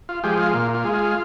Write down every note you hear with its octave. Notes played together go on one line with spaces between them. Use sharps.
F4
F3 G#3 G4
F4
A#2 F4
F4
G#3
F4